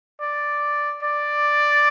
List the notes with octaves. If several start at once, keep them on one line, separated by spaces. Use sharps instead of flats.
D5
D5